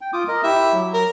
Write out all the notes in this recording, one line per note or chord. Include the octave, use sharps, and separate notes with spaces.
G5
F4 D6 D#6
A#4 D#5
E4 G4 E5
F#3
A#4